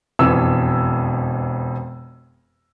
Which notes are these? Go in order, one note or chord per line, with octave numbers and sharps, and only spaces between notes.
E1 F2 E3 E6